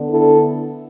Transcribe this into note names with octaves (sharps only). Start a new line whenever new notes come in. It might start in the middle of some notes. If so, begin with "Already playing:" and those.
Already playing: D3 B3 D4
E4 A4